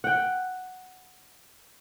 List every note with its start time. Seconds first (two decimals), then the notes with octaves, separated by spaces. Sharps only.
0.04 F#5 G5